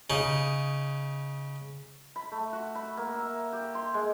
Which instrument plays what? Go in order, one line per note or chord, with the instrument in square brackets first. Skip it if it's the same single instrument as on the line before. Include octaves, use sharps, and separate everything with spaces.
[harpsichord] C#3 D#4
[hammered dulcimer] B5
A3
F#4
B5
A#3
E5
G4
C6
G#3